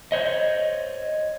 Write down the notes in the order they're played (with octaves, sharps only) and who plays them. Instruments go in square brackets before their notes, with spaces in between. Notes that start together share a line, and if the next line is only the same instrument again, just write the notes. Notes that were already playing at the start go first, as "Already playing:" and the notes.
[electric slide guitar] C5 C#5 D#5